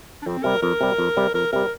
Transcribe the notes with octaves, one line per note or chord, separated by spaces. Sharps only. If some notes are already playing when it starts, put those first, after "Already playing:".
D4
F2 C4
C3 G3 A#4
F2 A#4
C3 G3
F2
C3 G3
F2 A#4
C3 G3 A#4